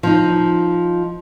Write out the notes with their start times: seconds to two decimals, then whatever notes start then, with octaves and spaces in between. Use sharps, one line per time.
0.03 F3 D#4